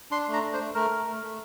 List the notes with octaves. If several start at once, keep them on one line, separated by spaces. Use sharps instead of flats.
D4 C6
A3
A#5
D4
C5
A3
A3 A#4
A3
A3
A3